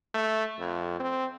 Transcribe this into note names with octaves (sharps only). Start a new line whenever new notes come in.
A3
F2
C4